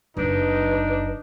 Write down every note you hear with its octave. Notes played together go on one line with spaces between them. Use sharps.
F#1 D4 D#4 B4